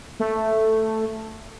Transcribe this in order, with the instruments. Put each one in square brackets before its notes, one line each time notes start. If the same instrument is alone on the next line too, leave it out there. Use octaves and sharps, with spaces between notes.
[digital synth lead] A3